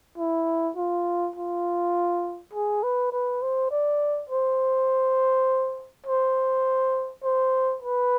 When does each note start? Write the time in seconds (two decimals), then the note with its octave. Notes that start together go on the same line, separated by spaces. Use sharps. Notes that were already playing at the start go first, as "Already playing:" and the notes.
0.18 E4
0.77 F4
1.36 F4
2.54 G#4
2.83 B4
3.12 B4
3.42 C5
3.71 D5
4.30 C5
6.07 C5
7.24 C5
7.82 B4